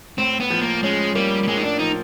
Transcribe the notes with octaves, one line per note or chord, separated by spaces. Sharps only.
A2 C4
B3
F3
A#3
G#3 C#4
G3 A#3
G3
A2 G#3
D#4
D4
F3 D#4